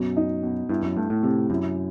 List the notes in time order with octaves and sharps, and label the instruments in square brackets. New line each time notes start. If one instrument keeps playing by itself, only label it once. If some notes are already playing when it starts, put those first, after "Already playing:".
Already playing: [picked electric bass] F#2 [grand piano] B2
[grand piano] D#4
B2
[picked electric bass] G2 [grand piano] E4
[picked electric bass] F#2
[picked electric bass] G2 [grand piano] A3
[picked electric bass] A2
[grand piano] C3
[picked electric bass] F#2 [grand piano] E4